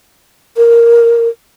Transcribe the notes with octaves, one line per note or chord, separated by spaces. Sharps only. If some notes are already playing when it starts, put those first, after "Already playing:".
A#4